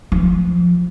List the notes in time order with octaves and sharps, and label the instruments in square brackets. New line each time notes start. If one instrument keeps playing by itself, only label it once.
[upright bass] F3